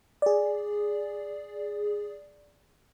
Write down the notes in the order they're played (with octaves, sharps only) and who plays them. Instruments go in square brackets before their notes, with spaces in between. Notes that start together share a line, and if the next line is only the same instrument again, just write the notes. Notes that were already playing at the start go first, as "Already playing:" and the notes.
[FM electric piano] G#4 D5